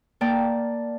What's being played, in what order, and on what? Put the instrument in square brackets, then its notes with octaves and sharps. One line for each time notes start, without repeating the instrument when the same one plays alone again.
[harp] A#3 D5 G5 A5